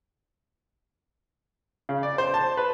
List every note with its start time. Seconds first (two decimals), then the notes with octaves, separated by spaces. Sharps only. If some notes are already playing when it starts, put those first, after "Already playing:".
1.89 C#3
2.03 D5
2.18 C5
2.34 A5
2.57 B4